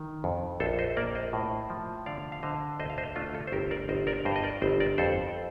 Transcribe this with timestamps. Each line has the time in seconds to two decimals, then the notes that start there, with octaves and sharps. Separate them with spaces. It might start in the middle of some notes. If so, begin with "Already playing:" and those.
Already playing: D#3
0.24 F2
0.60 A#1 A4 C5
0.78 C5 D#5
0.97 A#3 A#4 D5
1.15 C5 D#5
1.33 A2
1.70 F3
2.06 D3 D5 F5
2.32 F5
2.43 D3 C5 D#5
2.80 D2 C5 D#5
2.90 F5
2.98 C5 D#5
3.16 A3 D4 F4
3.35 F4 A4
3.47 C5
3.52 G1 G4 A#4
3.71 A#4 D5
3.89 G1 C5 D#5
4.07 A#4 D5
4.25 G2 C5 D#5
4.36 D#5
4.44 A#4 D5
4.62 G1 C5 D#5
4.80 A#4 D5
4.98 F2 A4 C5